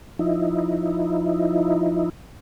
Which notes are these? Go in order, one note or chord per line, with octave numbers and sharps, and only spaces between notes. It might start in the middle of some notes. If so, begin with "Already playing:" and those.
F3 D#4 E4